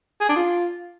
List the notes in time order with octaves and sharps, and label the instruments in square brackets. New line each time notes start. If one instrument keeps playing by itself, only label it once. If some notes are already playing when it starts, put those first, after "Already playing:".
[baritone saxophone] G#4
D4
F4